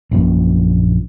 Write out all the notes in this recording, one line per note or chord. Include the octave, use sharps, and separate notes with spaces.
A#1 F#2 A#2